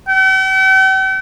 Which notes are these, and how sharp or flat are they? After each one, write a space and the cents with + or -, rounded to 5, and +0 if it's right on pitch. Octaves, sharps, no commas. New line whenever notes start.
G5 -45